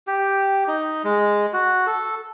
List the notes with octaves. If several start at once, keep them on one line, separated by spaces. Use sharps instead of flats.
G4
D#4
G#3
F#4
A4